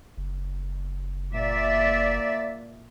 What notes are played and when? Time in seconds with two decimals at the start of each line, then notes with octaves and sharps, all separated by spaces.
0.17 F#1
1.35 A#2 D5 E5